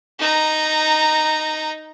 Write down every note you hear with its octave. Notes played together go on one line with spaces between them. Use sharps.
D#4 A#5